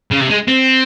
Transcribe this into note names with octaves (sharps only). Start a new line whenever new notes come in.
C#3
C3
G#3
C4